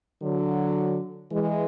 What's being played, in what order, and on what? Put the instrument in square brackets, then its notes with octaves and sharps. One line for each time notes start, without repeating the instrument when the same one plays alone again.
[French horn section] D3 F#3
E3 G#3